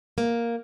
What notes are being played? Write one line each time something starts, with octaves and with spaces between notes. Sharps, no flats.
A#3